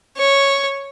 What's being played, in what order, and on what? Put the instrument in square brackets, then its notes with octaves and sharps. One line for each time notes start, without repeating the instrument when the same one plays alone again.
[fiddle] C#5